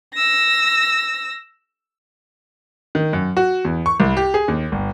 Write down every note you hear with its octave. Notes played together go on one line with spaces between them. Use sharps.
E6 A#6
D#3
F#2
F#4
E2
C#6
C2
G4
G#4
D#2
G1